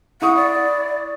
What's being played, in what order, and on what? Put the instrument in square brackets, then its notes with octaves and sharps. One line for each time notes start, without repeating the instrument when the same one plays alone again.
[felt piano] E4 C#6 D#6 [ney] F#5
[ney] D5